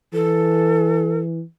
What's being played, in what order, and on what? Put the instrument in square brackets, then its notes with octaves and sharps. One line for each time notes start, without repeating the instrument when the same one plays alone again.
[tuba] E3 [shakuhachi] A4